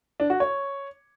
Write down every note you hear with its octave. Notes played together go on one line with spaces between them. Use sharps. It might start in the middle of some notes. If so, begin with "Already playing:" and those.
D4
F#4
C#5